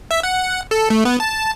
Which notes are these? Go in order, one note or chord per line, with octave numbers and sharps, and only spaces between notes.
E5
F#5
A4
A3
B3
A5